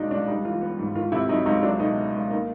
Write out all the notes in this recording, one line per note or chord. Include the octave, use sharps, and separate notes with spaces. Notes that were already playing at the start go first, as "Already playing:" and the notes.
Already playing: C#2 B2 F#3 D4 D#4
C#2 D4
G3 D#4
E3 F4
B3
G#2
D#3 F4
C3 E4
F#3 D#4
C#2 D#4
F#3 D4
B2 D#4
B3
C#2
A#3 D#4